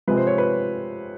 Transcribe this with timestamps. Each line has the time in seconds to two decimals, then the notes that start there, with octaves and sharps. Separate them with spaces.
0.07 C3 F3 G#3 B4
0.17 C5
0.27 C#5
0.38 B4